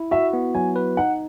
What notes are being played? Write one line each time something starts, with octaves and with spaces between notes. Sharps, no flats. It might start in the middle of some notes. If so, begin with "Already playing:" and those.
Already playing: E4
F#4 E5
B3
F#3 G#5
B4
D#4 F#5